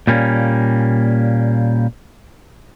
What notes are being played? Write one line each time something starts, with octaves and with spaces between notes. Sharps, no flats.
A#2 G3 A#3 C#4